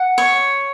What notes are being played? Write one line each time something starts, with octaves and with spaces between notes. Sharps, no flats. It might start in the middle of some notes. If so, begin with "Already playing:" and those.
Already playing: F#5
C#5